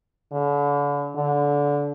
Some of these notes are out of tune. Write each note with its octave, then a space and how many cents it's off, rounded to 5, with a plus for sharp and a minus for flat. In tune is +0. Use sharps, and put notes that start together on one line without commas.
D3 -40
D3 -25